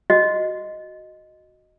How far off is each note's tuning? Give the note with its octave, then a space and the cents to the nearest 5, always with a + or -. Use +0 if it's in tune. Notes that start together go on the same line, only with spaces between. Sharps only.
F#4 -5 D#5 +0